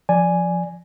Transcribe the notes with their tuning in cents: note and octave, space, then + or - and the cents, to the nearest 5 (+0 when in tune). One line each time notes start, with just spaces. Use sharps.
F3 +0 D5 +0 G#5 +0